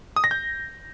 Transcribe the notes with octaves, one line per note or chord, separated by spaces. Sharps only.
D#6
A#6
G6